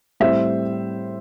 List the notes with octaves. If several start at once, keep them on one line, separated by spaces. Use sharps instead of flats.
A2 G3 C4 C5 E5